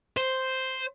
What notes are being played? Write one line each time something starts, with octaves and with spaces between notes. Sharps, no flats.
C5